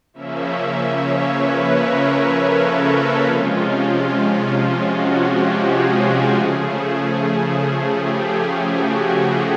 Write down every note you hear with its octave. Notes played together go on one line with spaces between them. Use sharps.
C#3 F3 A#3 C#4 E5
E5
C#5
B4
A#4
A4
C3 F3 G#3 C#4 F4
F#4
G4
G#4
C#3 F3 A3
G4
F#4